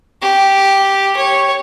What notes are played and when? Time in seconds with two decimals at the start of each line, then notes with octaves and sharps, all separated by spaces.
0.22 G4
1.16 C#5